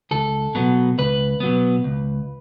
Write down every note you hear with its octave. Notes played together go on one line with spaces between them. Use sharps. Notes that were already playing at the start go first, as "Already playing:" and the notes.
C#2 A4
B2 F#3 B3
C#2 B4
B2 F#3 B3
C#2